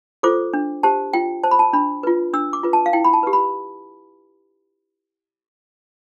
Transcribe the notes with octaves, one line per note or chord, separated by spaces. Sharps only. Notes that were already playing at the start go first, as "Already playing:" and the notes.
F4 A4 C5 D6
D4
G4 C5 A5
F4 G5
C5 A5
B5
A5
D4 B5
F4 B4
D4 E6
D6
F4 B4
A5
F5
E4 G5
B5
A5
G4 B4
B5